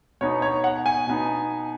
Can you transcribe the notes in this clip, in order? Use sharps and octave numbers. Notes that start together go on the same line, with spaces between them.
B2 B3 D#4 C#5
C#5
F#5
G#5
B2 B3 D#4